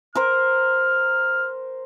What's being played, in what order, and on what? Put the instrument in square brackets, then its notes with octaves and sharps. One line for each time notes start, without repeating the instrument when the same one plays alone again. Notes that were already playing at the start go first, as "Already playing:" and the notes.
[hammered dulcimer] A#4 C5 [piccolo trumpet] F6